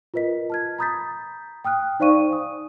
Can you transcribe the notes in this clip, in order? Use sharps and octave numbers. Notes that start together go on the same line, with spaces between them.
F4 A#4 B4 D#5 B6
A5 F6 G#6
A#5 B5 D#6 G6 A6 B6
G5 D#6 F6 F#6
D#4 C5 D5 F5 C#6 D#7
G#5 D#6